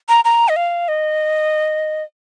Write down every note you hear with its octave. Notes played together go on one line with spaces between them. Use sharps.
A#5
A#5
D#5
F5
D#5